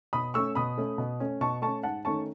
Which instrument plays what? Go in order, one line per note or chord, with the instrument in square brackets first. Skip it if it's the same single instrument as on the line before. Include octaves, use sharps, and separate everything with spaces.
[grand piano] B2 B5 D#6
A3 C#4 C#6 E6
B2 B5 D#6
A3 C#4
B2
A3 C#4
B2 A5 C#6
A3 C#4 A5 C#6
G#2 F#5 A5
D#3 A3 C#4 A5 C#6